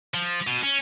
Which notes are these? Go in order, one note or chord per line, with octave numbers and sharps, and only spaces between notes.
F3
B2
C#4